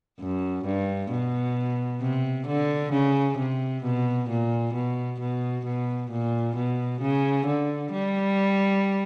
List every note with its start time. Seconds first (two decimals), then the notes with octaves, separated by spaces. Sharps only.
0.20 F#2
0.65 G2
1.11 B2
2.01 C3
2.47 D3
2.92 C#3
3.38 C3
3.83 B2
4.29 A#2
4.74 B2
5.20 B2
5.65 B2
6.10 A#2
6.56 B2
7.01 C#3
7.46 D3
7.92 G3